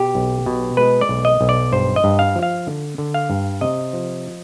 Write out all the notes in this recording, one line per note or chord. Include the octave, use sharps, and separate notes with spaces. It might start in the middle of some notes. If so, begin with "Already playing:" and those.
Already playing: B2 G4
B1
B2
G#3 B4
D5
B1
D#5
B1
D5
G2 C5
D#5
G2
F5
F3
F5
D3
D3
F5
G2
C3 D#5
F3